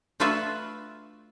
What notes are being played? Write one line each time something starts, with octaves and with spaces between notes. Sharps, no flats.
A3 D4 F4 F#4 B4 E5